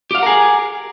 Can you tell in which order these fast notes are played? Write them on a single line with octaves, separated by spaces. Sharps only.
G4 F5 F#5 A#4 G#4